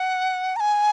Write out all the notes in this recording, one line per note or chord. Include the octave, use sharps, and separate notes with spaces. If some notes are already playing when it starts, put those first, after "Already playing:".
Already playing: F#5
A#5
G#5